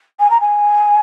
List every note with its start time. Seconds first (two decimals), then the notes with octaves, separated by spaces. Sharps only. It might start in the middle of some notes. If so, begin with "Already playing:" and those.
0.19 G#5
0.30 A#5
0.40 G#5